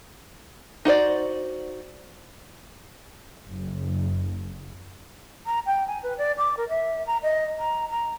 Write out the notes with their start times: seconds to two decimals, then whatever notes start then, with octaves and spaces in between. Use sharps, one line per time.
0.85 D#4 F#4 C5 D5
3.48 F#1
5.46 A#5
5.66 G5
5.87 G#5
6.03 B4
6.18 D5
6.38 D6
6.57 A#4
6.69 E5
7.07 A#5
7.23 D#5
7.59 A#5
7.89 A#5